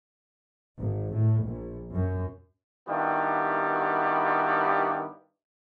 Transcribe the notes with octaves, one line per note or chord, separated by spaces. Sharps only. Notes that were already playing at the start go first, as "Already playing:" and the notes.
G#1
A2
A#1
F#2
G2 D#3 G3 B3 E4 F#4